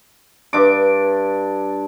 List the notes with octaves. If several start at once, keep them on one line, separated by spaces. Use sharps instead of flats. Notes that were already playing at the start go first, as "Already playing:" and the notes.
G2 D4 D6